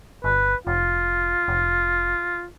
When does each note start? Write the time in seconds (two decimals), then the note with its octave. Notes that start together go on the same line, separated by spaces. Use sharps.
0.24 G1 B4
0.67 F1 F4
1.48 F1